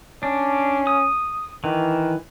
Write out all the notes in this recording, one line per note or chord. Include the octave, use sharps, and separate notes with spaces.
C#4 D4
D#6
D#3 E3